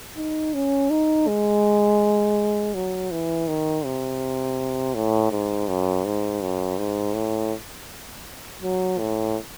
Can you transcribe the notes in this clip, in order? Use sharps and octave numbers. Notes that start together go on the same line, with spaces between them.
D#4
C#4
D#4
G#3
F#3
E3
D#3
C3
A2
G#2
F#2
G#2
F#2
G#2
A2
F#3
A2